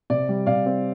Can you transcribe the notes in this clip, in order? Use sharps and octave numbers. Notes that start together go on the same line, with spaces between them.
C3 D5
G3
C3 D5 F5
C4